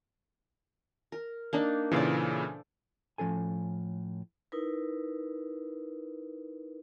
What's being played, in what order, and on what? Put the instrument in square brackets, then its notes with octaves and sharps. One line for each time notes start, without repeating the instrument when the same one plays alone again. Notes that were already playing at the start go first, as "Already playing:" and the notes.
[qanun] A#4
A#3 D4 D#4
[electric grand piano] A#2 C#3 E3 [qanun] A4 C5 D5
[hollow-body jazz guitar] A2 F3 C#4 A4 G#5
[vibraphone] D#4 E4 A#4 B4